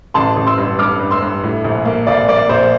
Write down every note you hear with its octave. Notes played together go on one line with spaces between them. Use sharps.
A1 A5 C6
A1
C6 E6
G2
G2 D6 F6
G2
C6 E6
G2
A2
A#1
A#3
A#1 D5 F5
A#3 D5
A#1 C5